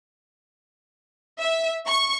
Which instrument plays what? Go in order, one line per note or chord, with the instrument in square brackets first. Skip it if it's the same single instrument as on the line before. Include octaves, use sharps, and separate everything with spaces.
[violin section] E5
C#6